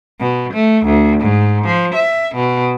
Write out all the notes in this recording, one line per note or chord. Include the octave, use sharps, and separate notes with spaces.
B2
A3
D2
G#2
F3
E5
B2